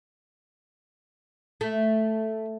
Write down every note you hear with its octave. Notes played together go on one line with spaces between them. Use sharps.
A3